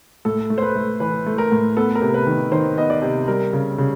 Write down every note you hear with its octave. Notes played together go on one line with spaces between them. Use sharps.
A2 A4
A3
C5
B4
A3
E3 B4
A3
A#4
A2
B3 A4
A#4
C3
B4
D#3
D#3 C5
B3 D#5
D5
C3
G3 A#4
C#3
C#3